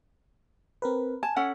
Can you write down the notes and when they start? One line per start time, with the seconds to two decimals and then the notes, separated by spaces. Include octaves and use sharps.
0.82 C4 A#4 B4
1.23 G#5 A5
1.36 C#4 A4 F#5